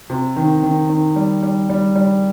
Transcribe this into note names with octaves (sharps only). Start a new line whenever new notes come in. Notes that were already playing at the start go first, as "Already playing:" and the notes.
C3
D#3
D#3
D#3
G3
G3
G3
G3